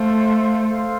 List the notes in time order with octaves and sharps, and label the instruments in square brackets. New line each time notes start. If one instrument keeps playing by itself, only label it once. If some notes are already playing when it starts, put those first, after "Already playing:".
Already playing: [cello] A3 [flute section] A4 C5 F5 C6
[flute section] A4 C5 F5 C6